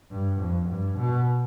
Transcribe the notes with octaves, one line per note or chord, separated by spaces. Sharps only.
G2
F2
G2
B2